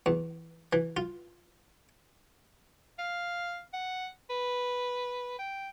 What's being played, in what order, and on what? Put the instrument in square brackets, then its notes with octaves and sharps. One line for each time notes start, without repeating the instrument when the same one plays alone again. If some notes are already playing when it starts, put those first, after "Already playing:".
[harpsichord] E2
E3
F4
[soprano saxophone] F5
F#5
B4
G5